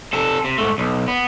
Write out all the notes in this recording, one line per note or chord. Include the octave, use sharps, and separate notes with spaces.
C3 A4
C3
G#2 A3
B1
B3